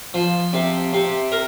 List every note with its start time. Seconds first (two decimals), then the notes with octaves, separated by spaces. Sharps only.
0.14 F3
0.53 C3
0.93 C3
1.32 A#4